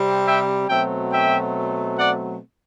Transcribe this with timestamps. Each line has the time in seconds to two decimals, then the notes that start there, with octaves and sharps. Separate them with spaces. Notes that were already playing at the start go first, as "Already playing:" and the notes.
Already playing: C3 G3 C4
0.26 E5 G5
0.69 B2 F#3 A3 C4 E5 G5
1.11 E5 G5
1.98 D5 F#5